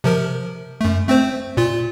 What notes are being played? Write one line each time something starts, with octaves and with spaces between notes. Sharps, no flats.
C3 F3 A#4
F#2 A3
A3 C4 C5
A#2 F4